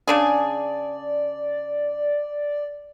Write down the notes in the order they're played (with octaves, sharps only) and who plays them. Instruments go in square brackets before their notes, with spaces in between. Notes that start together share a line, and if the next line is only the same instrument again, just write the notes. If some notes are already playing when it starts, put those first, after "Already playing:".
[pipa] C#3 D4 G#4 [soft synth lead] D5